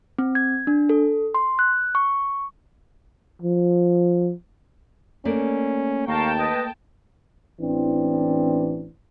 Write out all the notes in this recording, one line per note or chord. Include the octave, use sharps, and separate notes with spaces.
C4
G#6
D4
A4
C6
F#6
C#6
F3
A3 A#3 C#4 D5
D#2 F5 G5 A5 A#5 C#6
B4 D#5
A1 E3 C4 D4